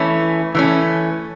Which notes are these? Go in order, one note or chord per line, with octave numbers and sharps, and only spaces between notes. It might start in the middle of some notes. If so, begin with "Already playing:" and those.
Already playing: E3 A3 C#4
E3 A3 C#4